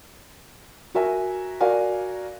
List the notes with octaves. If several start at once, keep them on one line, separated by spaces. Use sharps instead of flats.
F#4 A#4 E5 G#5
F#4 A#4 D5 F5 G#5